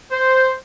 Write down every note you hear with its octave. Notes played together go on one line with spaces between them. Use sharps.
C5